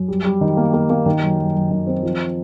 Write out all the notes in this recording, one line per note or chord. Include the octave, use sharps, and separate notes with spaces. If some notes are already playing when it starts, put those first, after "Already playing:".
Already playing: F#2
G3
G3
D#3
A#3
A#3
A#3
D#3
F#2
F#2
F#2
D#3
C4
F3